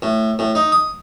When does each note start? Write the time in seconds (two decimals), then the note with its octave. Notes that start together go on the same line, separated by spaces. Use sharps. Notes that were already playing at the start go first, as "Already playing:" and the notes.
0.02 A2
0.39 A2
0.55 D#4
0.72 D#6